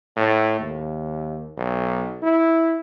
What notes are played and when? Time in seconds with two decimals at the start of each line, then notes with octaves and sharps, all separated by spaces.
0.17 A2
0.59 D#2
1.57 B1
2.23 E4